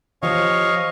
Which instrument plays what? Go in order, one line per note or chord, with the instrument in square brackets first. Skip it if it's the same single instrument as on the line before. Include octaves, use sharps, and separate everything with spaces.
[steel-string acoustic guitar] F3 G4 C5 [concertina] C#5 D#5 F5